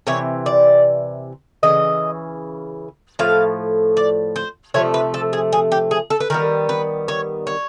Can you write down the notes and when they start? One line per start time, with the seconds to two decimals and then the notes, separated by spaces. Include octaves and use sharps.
0.07 C3 E3 C#5
0.46 D5
1.63 C#3 E3 D#5
3.19 A2 F3 F5
3.97 D5
4.36 C5
4.74 C3 F3 A3 C#5
4.94 B4
5.14 A4
5.33 G#4
5.53 G#4
5.72 G4
5.91 G#4
6.10 A4
6.20 B4
6.30 D#3 G3 B3 A#4
6.69 B4
7.08 C#5
7.47 C#5